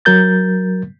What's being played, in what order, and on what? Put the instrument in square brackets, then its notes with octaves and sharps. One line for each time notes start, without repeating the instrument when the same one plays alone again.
[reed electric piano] F#3 A#4 G6 A6